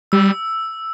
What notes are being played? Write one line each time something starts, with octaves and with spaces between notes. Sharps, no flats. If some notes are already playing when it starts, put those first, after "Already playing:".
G3 E6